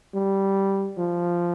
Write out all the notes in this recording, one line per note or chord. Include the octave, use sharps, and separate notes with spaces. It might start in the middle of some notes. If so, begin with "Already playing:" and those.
G3
F3